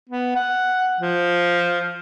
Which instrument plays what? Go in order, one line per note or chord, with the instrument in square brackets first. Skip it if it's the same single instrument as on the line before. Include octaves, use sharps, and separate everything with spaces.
[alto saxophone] B3
F#5
F3